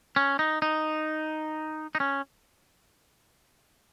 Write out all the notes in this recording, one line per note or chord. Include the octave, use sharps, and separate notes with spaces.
C#4
D#4
D#4
D#4
C#4